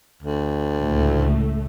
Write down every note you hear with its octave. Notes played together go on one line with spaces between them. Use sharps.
D2
C#2 A2 A3